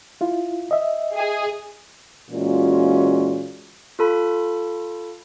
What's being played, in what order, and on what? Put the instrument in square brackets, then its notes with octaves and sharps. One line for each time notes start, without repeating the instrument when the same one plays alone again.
[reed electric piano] E4 F4
D#5 E5
[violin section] G#4
[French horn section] A#2 E3 G#3 C#4 F4 F#4
[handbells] F4 A4 B5